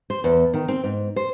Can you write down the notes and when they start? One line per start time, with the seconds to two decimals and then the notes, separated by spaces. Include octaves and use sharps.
0.10 C5
0.24 E2
0.54 D#3
0.68 C4
0.84 G#2
1.16 C5